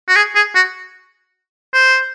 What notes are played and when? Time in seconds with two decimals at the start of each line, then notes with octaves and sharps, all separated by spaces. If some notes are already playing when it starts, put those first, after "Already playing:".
0.09 F#4
0.16 G#4
0.36 G#4
0.55 F#4
1.74 C5